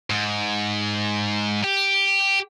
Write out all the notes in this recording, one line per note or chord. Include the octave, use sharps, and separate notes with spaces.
G#2
G4